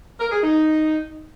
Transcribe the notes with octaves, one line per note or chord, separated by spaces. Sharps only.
A#4
G#4
D#4